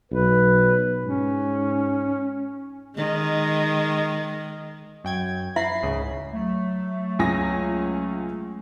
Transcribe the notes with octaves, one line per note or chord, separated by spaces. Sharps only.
B1 B4
G#2 C#4
D#3 G#3
F#2 G5 G#6
E4 E5 B5 C7
C#2 G#2 C#3
F#3 A3
C#2 G#5 A#6